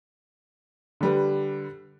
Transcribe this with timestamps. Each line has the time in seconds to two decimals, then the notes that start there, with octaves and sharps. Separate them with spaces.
1.01 D3 G3 B4